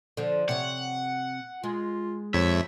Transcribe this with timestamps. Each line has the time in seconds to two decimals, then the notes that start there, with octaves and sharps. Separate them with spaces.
0.17 D3 F3
0.49 C3 C#5 F#5
1.64 G#3 F4
2.34 F2 C#5 E5